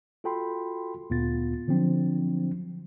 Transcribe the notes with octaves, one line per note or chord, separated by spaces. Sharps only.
F4 F#4 A4 G5 B5 C6
D2 A#2 B3 F4 A6
D3 F3 F#3 C4 D4